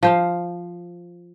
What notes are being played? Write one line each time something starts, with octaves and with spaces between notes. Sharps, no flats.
F3 C5 F5